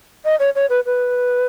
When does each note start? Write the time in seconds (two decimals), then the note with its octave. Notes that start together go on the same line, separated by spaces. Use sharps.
0.25 D#5
0.39 C#5
0.55 C#5
0.69 B4
0.86 B4